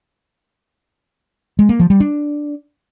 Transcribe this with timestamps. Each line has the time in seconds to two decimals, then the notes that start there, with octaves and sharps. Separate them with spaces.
1.59 G#3
1.69 A#3
1.80 F3
1.90 G3
2.00 D4